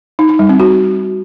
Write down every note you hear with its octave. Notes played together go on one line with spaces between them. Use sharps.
D#4
D#4
G3
C4
F#4